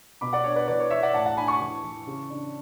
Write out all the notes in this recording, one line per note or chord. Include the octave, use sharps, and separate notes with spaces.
B2 B5 D6
D5 F#5
D4 C#5
B4 D5
E3 B4 D5
C#5
E3 C#5 E5
D5 F#5
A2 F#5 A5
F#5 A5
D4 G#5 B5
A5 C#6
E3
E3
C#3
D4